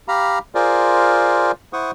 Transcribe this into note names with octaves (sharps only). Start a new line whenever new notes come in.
G4 F5 A#5 B5
F4 G#4 A#4 C5 D5
E4 C5 F#5 C#6 D#6